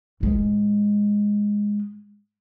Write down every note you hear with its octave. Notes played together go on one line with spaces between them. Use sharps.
A2 G#3